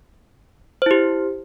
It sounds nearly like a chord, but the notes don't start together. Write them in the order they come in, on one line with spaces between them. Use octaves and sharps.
C5 E4 G4